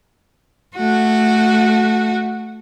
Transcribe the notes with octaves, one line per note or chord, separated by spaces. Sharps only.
A3 F#4